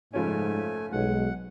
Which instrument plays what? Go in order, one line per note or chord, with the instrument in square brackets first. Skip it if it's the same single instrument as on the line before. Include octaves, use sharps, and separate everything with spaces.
[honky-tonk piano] F#1 F3 C#4 [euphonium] G#2 [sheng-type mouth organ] A3 G#5
[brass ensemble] B1 [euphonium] G#3 [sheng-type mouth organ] F#5